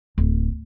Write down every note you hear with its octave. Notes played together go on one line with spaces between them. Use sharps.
D1